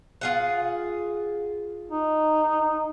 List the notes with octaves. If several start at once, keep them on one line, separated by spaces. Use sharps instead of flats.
F4 G#4 F#5
D#4